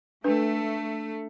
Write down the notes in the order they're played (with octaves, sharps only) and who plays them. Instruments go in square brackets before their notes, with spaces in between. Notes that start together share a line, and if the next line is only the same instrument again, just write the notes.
[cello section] A3 [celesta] D4 [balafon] B4